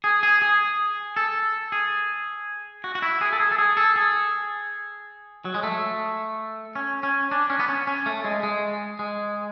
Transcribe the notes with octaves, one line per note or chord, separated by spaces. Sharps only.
G#4
G#4
G#4
A4
G#4
F#4
F#4
E4
G#4
A4
G#4
A4
G#4
A4
G#4
F#3
G#3
A3
C#4
C#4
D4
C#4
B3
C#4
C#4
A3
G#3
G#3
G#3